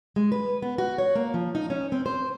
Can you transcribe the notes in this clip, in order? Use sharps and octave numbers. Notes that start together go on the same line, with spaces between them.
G#3
B4
B3
F#4
C#5
A#3
F3
D#4
C#4
C4
C5